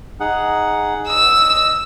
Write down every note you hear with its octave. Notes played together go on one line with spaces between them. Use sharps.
D#4 G#4 F#5
D#5 E6